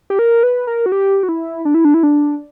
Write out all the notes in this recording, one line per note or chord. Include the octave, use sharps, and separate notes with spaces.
G4
A#4
B4
A#4
F#4
G4
F#4
E4
D4
E4
D4
E4
D4